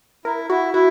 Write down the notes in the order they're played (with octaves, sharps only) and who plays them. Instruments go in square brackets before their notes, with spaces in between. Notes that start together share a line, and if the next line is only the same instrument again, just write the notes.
[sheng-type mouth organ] E4 [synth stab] A#4
[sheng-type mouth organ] E4 [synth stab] F#4
[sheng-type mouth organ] E4 [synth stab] F#4